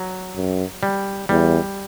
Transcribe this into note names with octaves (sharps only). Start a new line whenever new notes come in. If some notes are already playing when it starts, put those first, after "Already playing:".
Already playing: F#3
F#2
G3
E2 G3